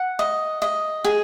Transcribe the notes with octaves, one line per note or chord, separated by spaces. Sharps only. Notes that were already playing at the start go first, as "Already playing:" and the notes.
Already playing: F#5
D#5
D#5
G#4